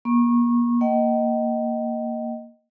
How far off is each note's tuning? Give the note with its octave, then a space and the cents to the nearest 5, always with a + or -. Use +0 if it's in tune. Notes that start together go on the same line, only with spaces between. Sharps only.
A#3 +40 C#6 -25
A#3 +0 D#5 +0 G5 -45